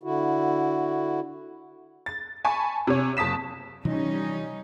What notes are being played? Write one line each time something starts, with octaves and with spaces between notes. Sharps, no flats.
D3 E4 F#4
A6
G#5 A5 B5 C#6
C3 C#5
F#1 A5 D#6 B6 E7
C3 E3 F3 G3 C#4 D#4